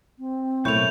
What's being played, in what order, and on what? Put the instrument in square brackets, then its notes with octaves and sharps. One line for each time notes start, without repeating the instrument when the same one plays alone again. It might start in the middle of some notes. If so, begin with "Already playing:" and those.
[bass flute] C4
[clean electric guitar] B1 A2 C#5 [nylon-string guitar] A3 A#3 E4 [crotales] G6 F7